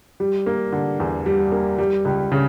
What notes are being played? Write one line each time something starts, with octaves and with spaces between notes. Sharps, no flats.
G3
A#3
D3
E2
G3
A#3
G3
C#2
C#3